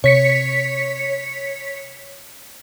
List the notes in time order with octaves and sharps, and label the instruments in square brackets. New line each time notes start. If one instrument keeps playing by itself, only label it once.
[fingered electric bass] C3 [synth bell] C#5 B6 C#7